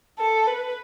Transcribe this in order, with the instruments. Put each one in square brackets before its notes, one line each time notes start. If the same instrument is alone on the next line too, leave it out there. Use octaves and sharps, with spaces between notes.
[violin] A4
B4